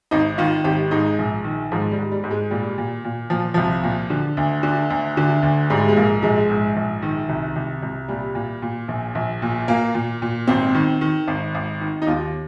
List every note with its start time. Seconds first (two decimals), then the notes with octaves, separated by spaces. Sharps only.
0.11 G#1 D#4
0.38 D#3 F4
0.64 G#1 G4
0.91 G#2 D#4
1.18 A#1
1.44 D#3
1.72 G#2 F3
1.91 G3
1.98 G#2
2.12 G3
2.24 G#2
2.31 G#3
2.51 A#2 G3
2.78 A#2
3.05 A#2
3.30 A#2 F3
3.54 C2 F3
3.83 A#2
4.10 D3
4.37 D2
4.63 D3
4.90 D2
5.17 D3
5.43 D2
5.70 G#2 G3
5.89 G#3
5.96 A#1 A#3
6.22 A#1 G#3
6.50 G#2
6.76 A#1
7.02 D#3
7.29 C2
7.56 C2
7.83 C2
8.08 A#2 G3
8.35 A#2
8.62 A#2
8.88 A#1
9.15 A#1
9.42 A#2
9.68 A#2 A#3
9.95 A#2
10.22 A#2
10.47 G#1 C4
10.75 D#3
11.01 D#3
11.28 G#1
11.55 G#1
11.81 D#3
12.02 D#4
12.07 D#2 F4